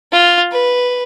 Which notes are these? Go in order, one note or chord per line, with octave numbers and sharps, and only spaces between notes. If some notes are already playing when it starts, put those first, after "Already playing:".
F4
B4